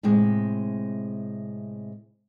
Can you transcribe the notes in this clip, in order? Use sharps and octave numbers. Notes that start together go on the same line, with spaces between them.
A2 C3 G#3